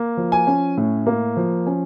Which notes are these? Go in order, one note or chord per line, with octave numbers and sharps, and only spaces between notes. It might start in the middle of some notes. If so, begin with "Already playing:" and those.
Already playing: A#3
F3
G#5
C#4
A2
A#3
F3
C#4